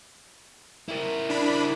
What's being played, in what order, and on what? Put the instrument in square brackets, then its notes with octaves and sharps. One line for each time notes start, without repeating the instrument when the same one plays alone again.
[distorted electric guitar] E4 A#4
[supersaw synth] D4 B5